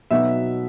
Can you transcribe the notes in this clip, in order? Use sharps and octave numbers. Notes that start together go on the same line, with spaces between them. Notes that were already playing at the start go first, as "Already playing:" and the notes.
B2 F#3 B3 D#4 E5